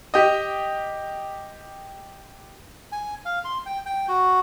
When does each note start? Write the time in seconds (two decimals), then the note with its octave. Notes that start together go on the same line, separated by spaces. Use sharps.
0.14 G4 D#5
2.92 G#5
3.25 F5
3.45 C6
3.66 G5
3.86 G5
4.08 F#4